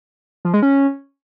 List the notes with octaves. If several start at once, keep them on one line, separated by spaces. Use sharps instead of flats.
F3
G#3
C#4